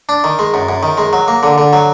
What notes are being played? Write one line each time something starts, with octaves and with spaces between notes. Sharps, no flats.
D4
D#3
G#3
F#2
F#2
D#3
G#3
F#3
A#3
D3
D3
F#3